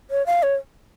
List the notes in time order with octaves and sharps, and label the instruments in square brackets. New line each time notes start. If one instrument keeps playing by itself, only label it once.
[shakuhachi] C#5
F5
C#5